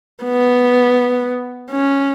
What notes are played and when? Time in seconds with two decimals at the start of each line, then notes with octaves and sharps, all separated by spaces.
0.24 B3
1.71 C#4